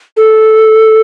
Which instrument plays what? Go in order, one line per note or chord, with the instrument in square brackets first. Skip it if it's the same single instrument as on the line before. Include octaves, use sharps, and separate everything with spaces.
[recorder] A4